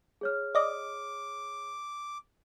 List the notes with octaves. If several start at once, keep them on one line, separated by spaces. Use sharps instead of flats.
G#4 C#5 F6
D5 D#5 D6